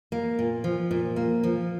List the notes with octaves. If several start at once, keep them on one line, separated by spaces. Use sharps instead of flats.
A#3
A#2
F3
A#2
A#3
F3